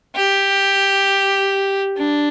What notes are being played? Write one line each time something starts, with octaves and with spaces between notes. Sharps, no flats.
G4
D4